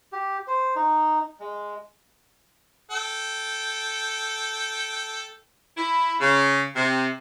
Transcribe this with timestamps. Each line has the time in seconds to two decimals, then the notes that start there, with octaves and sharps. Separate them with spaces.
0.12 G4
0.47 C5
0.76 D#4
1.40 G#3
2.91 A4 G5
5.77 E4
6.19 C#3
6.75 C3